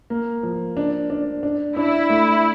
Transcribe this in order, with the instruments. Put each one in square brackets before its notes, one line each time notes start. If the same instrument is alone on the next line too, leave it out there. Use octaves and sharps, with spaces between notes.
[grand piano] A#3
F3
D4
D4
D4
[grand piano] D4 [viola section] E4
[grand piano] A3